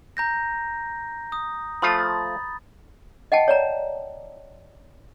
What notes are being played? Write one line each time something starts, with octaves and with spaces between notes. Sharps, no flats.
A#5 G6 A#6
D#6
F3 A3 F4 B5 D#6 A6
D#5 F#5 G5 A5
C#5 D5 A#5